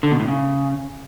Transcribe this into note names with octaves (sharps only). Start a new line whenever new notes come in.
D3
B2
A2
C#3